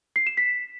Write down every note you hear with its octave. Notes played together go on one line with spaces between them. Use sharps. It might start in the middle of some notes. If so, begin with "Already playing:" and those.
C7
E7
B6